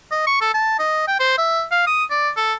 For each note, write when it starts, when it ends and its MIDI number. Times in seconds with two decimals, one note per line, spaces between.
0.11 0.24 75
0.27 0.37 85
0.41 0.53 69
0.54 0.79 81
0.79 1.03 75
1.07 1.17 79
1.19 1.35 72
1.38 1.63 76
1.71 1.86 77
1.87 2.04 87
2.10 2.30 74
2.36 2.54 69